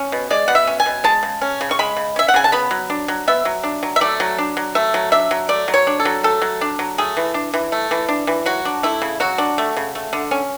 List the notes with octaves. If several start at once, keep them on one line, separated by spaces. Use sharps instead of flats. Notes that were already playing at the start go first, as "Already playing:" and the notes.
Already playing: C#4
B2
G#3 D5
B2 F#5
E5
C#4
G#5
B2
G#3 A5
C#3
C#4
C#3
C#6
G#3 B5
C#3
C#4 E5
F#5
C#3 G#5
A5
B3 B5
F#3
D4
F#3
B3 E5
F#3
D4
F#3
E5
A3 D5
F#3
D4
F#3
A3 E5
F#3
D4 E5
F#3
A3 D5
F#3
C#5
D4
A4
F#3
A3 A4
F#3
D4
F#3
A3 G#4
E3
D4
E3
A3
E3
D4
E3
F#3 F#4
D4
A3 E4
C#3
F#3 F#4
D4
A3
C#3
A3
D3
C#4